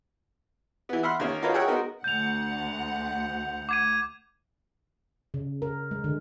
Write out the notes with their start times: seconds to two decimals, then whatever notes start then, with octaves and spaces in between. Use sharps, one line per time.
0.89 E3 B3
1.03 E5 F#5 B5 C6 F6 F#6
1.20 D#3 A#3 C#4
1.42 D#4 F4 F#4 A#4 B4 C#5
1.54 G#4 A#4 C#5 E5 F#5 G5
1.68 G#3 B3 D#4 F#4 A#4
2.04 D2 F#5 G6 F7
3.69 D6 G#6 D#7
5.34 C#3
5.62 A#4
5.91 G#3
6.04 D3